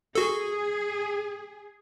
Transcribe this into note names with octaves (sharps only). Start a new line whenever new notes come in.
F#4 G#4 A4